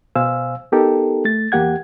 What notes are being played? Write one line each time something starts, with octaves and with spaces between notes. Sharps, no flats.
B2 C5 F5 G#5 E6
B3 D#4 G4 A4 A#4
A3 A6
E2 A#3 G4 F#5 G#6